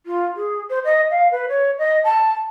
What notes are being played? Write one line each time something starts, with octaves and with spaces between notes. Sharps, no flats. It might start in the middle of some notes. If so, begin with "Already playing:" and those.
F4
G#4
C5
D#5
F5
B4
C#5
D#5
A5